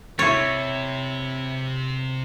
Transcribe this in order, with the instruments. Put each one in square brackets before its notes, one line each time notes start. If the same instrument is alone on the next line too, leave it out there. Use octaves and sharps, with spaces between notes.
[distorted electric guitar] C3 [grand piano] E4 A6 [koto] C#5